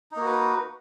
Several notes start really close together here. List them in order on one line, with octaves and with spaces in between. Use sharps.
D#4 A#3 F#4 B4